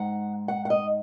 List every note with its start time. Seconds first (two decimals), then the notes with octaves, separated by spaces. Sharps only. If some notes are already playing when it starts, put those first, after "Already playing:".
Already playing: G#2 G#3 D#4 F#5
0.48 F#5
0.65 F#5
0.70 D#5